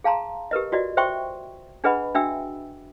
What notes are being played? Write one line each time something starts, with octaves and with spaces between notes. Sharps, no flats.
G#4 F5 A5 A#5 C6
G4 A#4 B4 D#5
F4 F#4 D5 D#5
C5 E5 G5 C6 C#6
D4 G#4 B4 D#5 F#5 B5
D4 F#4 E5 G5 E6